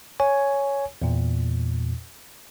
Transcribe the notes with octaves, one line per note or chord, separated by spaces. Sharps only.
C#5 G#5
E2 A#2